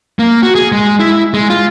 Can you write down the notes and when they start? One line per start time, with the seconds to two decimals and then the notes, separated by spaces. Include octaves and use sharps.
0.19 A#3
0.43 F#4
0.55 G#4
0.72 G#3
1.00 E4
1.34 G#3
1.50 F4